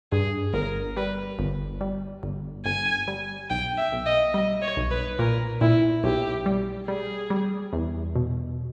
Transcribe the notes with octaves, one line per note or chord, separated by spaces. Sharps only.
G2 G#4
G1 A#4
G3 B4
G1
G3
G1
G1 G#5
G3
B1 G5
E5
B1
D#5
G3 D#5
C#5
B1
B4
A#2 A#4
A#2 E4
B1 G4
G3
G3 G#4
G3
E2
B2